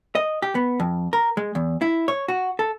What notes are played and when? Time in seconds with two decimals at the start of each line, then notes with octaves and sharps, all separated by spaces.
0.15 D#5
0.42 G4
0.55 B3
0.80 F2
1.13 A#4
1.37 G#3
1.55 E2
1.81 E4
2.08 C#5
2.28 F#4
2.59 A4